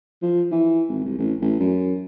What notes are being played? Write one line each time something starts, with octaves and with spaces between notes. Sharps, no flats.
F3
E3
G#1
C2
A1
A1
F#2